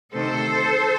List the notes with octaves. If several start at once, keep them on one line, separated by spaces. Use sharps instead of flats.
D2 C3 D#3 A4 C5